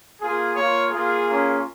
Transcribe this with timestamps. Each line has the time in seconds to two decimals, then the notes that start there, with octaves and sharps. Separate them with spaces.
0.21 A#3 F4 G#4
0.56 A#3 F4 C#5
0.91 A#3 F4 G#4
1.27 A#3 C#4 F4